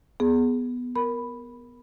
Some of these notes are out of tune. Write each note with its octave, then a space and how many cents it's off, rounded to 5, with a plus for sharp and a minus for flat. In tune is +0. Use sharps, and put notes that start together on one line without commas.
B3 +0 G#4 +5
A#4 +5 B5 +0